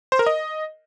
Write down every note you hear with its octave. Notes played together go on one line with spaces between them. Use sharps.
C5
A#4
D#5